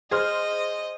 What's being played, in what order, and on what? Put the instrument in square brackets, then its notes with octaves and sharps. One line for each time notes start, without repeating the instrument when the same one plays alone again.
[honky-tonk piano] G#4 C5 F6 [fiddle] D#5